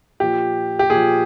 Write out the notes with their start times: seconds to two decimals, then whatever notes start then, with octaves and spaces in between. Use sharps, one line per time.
0.20 A#2 F3 G4
0.79 G4
0.90 A#2 F3 G#4